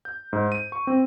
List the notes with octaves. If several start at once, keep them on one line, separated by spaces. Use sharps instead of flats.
G6
G#2
D#7
C#6
C4